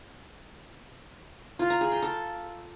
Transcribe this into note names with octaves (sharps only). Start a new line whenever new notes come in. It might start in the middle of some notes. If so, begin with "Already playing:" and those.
F4
A#5
G#4
G5
A4